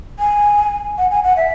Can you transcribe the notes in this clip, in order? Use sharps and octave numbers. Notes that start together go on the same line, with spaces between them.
G#5
F#5
G#5
F#5
E5